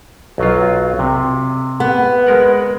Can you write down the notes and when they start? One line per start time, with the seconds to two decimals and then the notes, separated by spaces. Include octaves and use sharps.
0.38 B1 F#3 F4
0.99 C3
1.80 B3
2.27 G#3 A#4 F#5